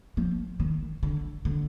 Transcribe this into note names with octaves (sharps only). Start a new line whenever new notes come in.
F3
D#3
D3
D3